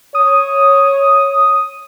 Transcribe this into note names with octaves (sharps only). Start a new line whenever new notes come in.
C#5 D#6